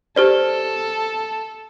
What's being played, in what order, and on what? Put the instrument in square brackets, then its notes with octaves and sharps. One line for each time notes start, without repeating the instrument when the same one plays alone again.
[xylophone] G4 C5 D5 [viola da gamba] A4